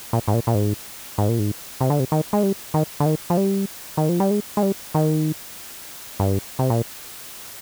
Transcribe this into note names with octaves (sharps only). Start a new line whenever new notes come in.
A#2
G#2
A#2
A#2
G#2
G#2
A#2
G#2
C3
D3
C3
D#3
G#3
G3
D#3
D3
D#3
F3
G3
D#3
F3
G3
G#3
G#3
G3
D#3
G2
C3
A#2